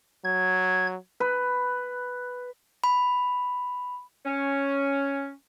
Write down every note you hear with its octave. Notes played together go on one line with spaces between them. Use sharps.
F#3 G#6
B4
B5
C#4